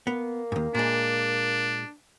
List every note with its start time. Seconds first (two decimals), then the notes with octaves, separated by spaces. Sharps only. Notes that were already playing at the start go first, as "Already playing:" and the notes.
0.07 A#3 B3
0.52 D#2 G#2
0.75 A#2 G#3 D4